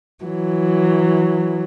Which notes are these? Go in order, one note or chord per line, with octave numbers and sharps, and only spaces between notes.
E3 F#3